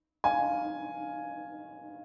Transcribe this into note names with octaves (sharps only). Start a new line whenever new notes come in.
F5 G#5